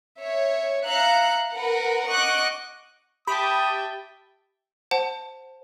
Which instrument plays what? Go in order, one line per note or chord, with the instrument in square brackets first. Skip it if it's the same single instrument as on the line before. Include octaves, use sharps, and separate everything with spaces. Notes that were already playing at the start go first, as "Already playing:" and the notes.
[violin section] C#5 E5
E5 F5 A#5 F#6 C#7
A#4 B4 F#5
D#5 F#5 C#6 D6 F#6
[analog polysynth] G4 A5 [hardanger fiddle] E5 G5 [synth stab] B5 [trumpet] D#6
[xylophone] C5 F#5 A5